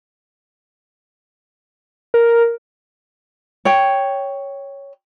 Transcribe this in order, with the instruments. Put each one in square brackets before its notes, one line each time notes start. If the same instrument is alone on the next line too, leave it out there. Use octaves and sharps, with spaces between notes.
[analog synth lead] A#4
[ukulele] C#5 G5